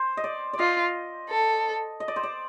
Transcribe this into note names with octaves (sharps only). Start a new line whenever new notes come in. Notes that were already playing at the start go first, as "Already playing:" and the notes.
Already playing: C5
D#5
D5
D5
F4 D#5
A4
D#5
D5
C5
D5